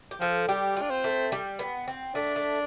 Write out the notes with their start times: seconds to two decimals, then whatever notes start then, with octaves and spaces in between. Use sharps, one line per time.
0.11 G4
0.21 F3 A4
0.48 G3 G4
0.77 F4
0.82 D4
0.90 C4
1.04 A3
1.32 G3
1.59 B3
1.88 C4
2.15 A3 D4
2.36 A3